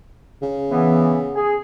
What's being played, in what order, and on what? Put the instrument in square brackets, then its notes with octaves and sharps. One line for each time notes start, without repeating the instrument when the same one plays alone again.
[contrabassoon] C#3
[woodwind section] E3 B3
G#4